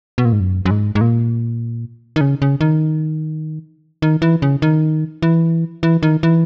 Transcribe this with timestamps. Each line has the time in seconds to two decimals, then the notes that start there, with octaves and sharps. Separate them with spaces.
0.18 B2
0.25 A#2
0.33 G#2
0.40 F#2
0.65 F#2
0.71 G#2
0.95 G#2
1.01 A#2
2.16 D#3
2.21 C#3
2.42 C#3
2.61 D#3
4.02 D#3
4.22 E3
4.42 C#3
4.62 D#3
5.22 E3
5.83 E3
6.03 D#3
6.23 E3